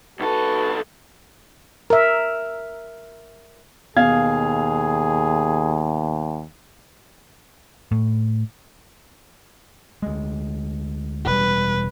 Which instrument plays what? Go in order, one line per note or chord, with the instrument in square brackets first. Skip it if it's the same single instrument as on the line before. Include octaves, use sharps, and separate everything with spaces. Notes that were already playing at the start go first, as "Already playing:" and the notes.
[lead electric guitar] C2 A4 [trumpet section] F#4 B4
[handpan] A#4 E5
[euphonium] D#2 [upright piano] B2 F5 G#6 [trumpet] G#4
[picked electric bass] A2
[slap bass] D2 G#3
[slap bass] E1 G3 [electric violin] B4